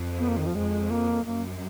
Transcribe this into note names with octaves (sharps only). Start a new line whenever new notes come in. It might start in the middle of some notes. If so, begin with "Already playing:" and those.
Already playing: F2
B3
A#3
D#3
F3
F2 G#3
A#3
F#2 A#3